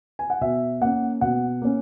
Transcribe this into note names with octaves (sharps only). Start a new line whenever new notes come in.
G#5
F#5
B2 E5
A#3 C#4 F#5
B2 F#5
A#3 C#4